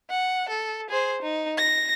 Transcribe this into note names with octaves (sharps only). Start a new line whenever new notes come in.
F#5
A4
G#4 C5
D#4
A#6